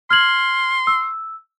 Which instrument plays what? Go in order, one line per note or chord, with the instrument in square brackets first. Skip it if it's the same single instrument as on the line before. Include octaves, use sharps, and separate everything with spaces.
[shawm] C6 [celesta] F6 G#6 F#7
[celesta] E6